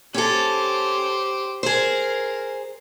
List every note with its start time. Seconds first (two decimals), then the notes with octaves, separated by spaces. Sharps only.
0.14 C#4 G4 A4 C5
1.63 G#4 A#4 C5